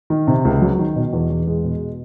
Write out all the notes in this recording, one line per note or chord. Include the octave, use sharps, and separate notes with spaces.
D#3
C3
C#2
F#3
D#3
B2
E2
E2
G#3
B2